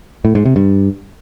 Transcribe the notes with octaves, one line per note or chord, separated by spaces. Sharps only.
A2
G#2
C3
G2